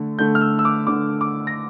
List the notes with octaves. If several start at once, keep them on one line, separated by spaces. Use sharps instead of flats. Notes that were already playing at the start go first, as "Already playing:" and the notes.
Already playing: D3 A3
D3 A3 G6
F6
E6
E6
D6
D3 A3 D6
D6
A#6